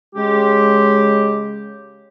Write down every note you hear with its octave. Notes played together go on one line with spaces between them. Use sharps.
C#3 G#3 G4